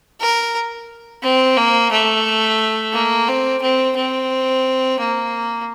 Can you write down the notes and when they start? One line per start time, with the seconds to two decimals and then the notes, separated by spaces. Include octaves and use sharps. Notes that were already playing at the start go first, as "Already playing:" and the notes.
0.21 A#4
1.23 C4
1.57 A#3
1.91 A3
2.93 A#3
3.28 C4
3.62 C4
3.97 C4
5.00 A#3